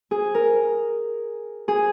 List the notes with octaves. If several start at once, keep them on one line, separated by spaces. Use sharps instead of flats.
G#4
A#4
G#4